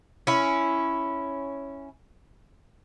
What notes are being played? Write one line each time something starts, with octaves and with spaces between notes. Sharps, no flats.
C#4 E4